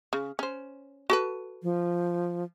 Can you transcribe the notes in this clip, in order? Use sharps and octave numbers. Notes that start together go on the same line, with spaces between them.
C#3
C#4 C5
F#4 A4 B4
F3